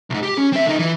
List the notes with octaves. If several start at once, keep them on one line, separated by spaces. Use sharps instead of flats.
C2 G#2
G4
C#4
C4 E5
D3 D#4
E3